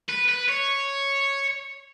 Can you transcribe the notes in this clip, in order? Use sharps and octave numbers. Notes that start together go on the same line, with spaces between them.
B4
B4
C#5